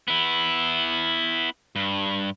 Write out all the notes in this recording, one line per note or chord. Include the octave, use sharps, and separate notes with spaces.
B3 E4
G2